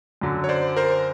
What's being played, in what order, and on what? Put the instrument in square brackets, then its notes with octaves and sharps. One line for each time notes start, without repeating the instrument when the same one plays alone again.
[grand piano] F#2 D3 F#3
[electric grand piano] C#5
C5 D5
A#4 C5